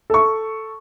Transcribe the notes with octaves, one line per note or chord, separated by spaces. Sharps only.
A4 C#6